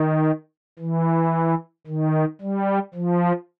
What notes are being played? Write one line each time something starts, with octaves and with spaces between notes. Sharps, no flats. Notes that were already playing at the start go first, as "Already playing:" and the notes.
Already playing: D#3
E3
D#3
G3
F3